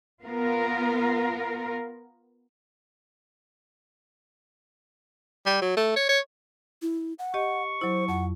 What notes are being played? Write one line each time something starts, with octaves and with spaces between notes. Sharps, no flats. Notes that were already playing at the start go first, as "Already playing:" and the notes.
B3 F4 A#4
G3
F#3
A3
C#5
C#5
E4
F#5
G4 D#5 C#6
F#3 E4 C5
F2 F#5